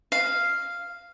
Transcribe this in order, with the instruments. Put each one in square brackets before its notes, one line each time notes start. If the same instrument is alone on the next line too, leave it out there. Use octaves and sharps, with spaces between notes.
[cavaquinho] F5